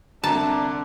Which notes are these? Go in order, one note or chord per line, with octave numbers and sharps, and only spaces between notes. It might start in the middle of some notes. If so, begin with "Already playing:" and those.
C2 D3 D4 A5 A#5